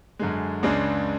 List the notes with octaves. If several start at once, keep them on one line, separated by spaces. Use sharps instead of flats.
F#2 D3 G#3
C#2 C#3 G#3 D4